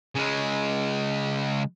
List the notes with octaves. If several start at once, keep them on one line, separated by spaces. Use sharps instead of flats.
C#3 G#3